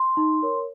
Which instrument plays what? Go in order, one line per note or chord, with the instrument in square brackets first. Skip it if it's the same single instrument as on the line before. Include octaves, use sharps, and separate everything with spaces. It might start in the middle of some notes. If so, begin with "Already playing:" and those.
Already playing: [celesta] C6
D#4
A#4 C#5